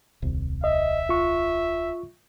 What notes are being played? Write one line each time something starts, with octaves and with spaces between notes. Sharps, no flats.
D#1 C2
D#5 E5
F4 C#6